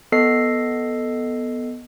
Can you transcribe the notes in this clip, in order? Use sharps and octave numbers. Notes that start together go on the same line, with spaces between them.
B3 A4 D#5 C7